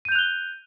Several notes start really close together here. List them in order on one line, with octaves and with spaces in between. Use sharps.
D#7 G6 F7 F#6 G7